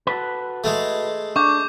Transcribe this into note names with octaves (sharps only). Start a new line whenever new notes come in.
F#4 A4 B4
G#3 A3
D4 C#6 D6 G6